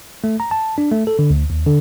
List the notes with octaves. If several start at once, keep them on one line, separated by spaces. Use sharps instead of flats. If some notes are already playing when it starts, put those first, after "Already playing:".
A3
A#5
A5
D4
A3
A4
D3
D2
D#2
D3